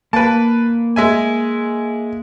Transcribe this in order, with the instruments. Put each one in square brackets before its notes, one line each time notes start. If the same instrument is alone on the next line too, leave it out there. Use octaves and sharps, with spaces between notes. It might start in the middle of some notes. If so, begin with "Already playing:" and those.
[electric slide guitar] A#3 [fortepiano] B4 A5
[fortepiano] G#3 E5 G#5